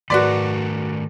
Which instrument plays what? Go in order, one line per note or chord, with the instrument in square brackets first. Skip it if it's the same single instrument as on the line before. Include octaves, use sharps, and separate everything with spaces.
[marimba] G#2 B4 F#6 [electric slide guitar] D#3 A3 A#4 [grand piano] F#4 D5